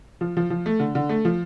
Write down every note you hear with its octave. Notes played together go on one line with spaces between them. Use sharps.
F3
F3
F3
A3
D3
D3
A3
F3